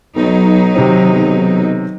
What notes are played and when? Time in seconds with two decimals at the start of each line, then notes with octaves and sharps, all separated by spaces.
0.16 B1 F#3 D#4
0.75 C3 D#3 C4
1.13 B1